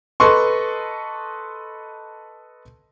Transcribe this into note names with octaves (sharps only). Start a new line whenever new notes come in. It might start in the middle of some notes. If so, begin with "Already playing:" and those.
A4 B4 D#5 C6 C#6